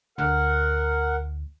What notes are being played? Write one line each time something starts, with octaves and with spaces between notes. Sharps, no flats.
D2 A#4 F#5